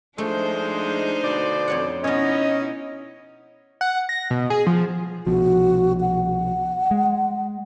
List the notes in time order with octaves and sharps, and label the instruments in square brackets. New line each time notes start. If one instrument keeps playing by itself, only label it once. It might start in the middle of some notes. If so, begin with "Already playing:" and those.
[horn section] F3 G#3 [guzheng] A3 [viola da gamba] D4 D#4 C5
[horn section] B2 D3 D5
[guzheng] F2 C#5 F#5
[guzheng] B2 B3 [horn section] C#4 [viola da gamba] D#4 E4 [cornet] D#5
[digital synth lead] F#5
A#6
B2
G#4
F3
[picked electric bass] C2 B2 F3 [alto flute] F#4
[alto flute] F#5
[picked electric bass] G#3